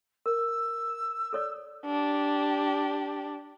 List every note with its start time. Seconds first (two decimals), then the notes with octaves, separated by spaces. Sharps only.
0.26 A#4 E6
1.33 A4 C#5 D5
1.85 D4 G4